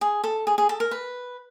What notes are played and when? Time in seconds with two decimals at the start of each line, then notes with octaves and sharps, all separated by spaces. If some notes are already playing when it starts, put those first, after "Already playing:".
0.01 G#4
0.24 A4
0.47 G#4
0.58 G#4
0.69 A4
0.80 A#4
0.91 B4